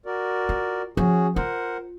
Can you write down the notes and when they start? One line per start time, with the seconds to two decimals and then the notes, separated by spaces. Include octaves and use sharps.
0.06 F#4 A#4 D5
0.49 F4
0.97 F3 C#4 F#4 G#4
1.36 F4 A#4 C5 F#5